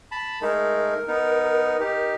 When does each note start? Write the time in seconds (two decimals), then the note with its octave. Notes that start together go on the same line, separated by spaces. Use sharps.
0.12 A5 B5
0.42 G#3 A3 D#4 A#4
1.08 B3 D#4
1.80 D#4 G4